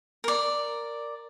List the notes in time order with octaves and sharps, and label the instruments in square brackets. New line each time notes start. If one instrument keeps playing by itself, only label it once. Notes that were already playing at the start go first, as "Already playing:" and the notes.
[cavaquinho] A#4 D5